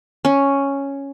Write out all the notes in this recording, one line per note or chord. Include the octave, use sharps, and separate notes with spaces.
C#4